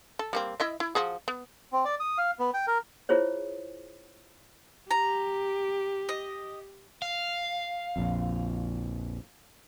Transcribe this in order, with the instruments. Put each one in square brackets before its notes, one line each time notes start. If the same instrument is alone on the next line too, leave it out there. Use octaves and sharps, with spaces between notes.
[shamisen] A4
G3 A#3 C4
E4 D#5 E5
E4
F3 F#4 G#4
B3
[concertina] C4
D5
D#6
F5
B3
G5
A#4
[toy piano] E4 F4 G#4 C5 C#5
[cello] G4 [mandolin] A#5
[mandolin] D#5
[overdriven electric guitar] F5
[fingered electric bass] A#1 F2